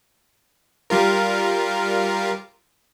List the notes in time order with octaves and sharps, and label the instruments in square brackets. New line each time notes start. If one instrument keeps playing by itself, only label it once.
[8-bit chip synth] G3 F4 A#4